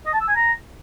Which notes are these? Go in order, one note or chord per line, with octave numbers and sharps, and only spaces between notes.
D#5
A5
E6
G#5
A#5